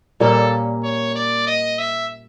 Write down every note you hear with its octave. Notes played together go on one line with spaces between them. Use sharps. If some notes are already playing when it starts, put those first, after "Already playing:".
A#2 G3 A#3 C#4 A4
C#5
D5
D#5
E5